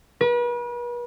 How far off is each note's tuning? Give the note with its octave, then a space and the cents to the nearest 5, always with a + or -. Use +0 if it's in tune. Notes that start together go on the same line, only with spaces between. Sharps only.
B4 -40